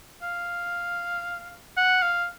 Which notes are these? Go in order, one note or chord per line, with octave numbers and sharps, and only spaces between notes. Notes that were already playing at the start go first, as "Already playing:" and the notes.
F5
F#5
F5